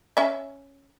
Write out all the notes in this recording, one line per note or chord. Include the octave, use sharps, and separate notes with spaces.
C#4 E5